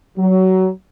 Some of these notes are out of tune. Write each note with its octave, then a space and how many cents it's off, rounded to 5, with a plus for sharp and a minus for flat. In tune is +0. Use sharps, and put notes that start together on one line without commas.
F#3 +20